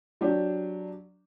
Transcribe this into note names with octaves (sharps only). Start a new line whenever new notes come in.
F#3 D4 G4